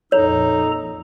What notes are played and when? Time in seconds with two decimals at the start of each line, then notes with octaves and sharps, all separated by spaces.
0.12 A#1 F2 D#4 A4 C#5 A#5